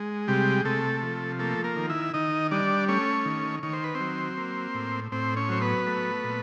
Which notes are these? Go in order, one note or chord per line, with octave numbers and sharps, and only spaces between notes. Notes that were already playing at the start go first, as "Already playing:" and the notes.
Already playing: G#3
C3 G3 G4
C3 A3 A4
F3
A3 A#3 A4
A#3 A#4
D#3
E4 E5
D#3 D#4 D#5
G3 D4 D5
A3 C#4 C#5
D#3
D#3 C#5
C5
B4
C4 C5
F#3
A#3
A2
A2 C4 C5
C#4 C#5
F#3 C5
B3 B4
A3
A#2